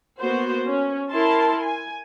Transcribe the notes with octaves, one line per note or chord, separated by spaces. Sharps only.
A#3 B3 F#4 C5
C#4
E4 A#4 A5 C6
G#5